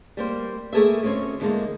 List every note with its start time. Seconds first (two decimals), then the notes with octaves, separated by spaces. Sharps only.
0.17 G3 A#3 C5
0.73 A3 A#3 G#4 A4 B4 E5
1.03 D2 C4 C#4 C5 C#5
1.40 E2 D3 E3 G#3 A#3